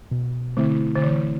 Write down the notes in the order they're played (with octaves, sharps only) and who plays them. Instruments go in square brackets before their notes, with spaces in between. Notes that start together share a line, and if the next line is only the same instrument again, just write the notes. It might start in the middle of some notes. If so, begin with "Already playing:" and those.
[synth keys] B2
[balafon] D3 [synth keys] A3 C4 E4
[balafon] D3
[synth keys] B2 [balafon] E3